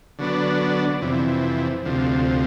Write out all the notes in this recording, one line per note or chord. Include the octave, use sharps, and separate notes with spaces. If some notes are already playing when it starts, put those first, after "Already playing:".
D3 F#3 B3 D4
F2 C3 E3
D2 C3 F3